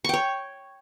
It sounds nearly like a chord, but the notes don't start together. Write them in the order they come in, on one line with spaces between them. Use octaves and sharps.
C#6 G5 C#5